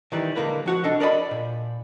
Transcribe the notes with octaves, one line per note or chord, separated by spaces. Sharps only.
D#3 E3 G3
D3 G#3 A#3 A#4 B4
F3 F#4 F#5
C2 D4 A4 D#5
A#4 D5 D#5 A5 B5
A#2